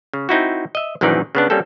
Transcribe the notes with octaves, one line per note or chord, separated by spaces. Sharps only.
C#3
C4 D#4 E4 F#4
D#5 E5
A#1 F#2 D#3 E3 D#4 D5
C#3 B3 D4
G3 A#3 C4 C#4 A4